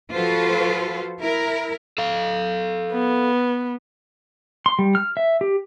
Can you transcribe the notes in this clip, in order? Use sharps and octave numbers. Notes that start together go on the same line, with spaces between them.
F3 F4 F#4 A4 B4 C5
E4 A#4
A4 F5
B3
C6
G3
F6
E5
G4